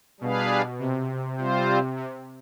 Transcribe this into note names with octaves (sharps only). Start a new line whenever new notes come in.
B2 G3 D4 G#4 B4 F5
C3
C3 G3 C4 F4 C5
C3